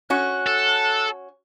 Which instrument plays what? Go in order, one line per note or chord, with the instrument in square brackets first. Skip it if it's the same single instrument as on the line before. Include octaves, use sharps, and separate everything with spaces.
[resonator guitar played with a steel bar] C#4 F#4 [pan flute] F#6
[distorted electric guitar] A4